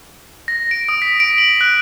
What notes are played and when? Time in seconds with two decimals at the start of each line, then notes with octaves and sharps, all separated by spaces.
0.48 A#6
0.71 D7
0.89 D#6
1.02 B6
1.20 D7
1.38 F#7
1.61 F#6